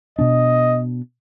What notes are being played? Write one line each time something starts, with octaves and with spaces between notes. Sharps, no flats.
B2 B3 D4 D#5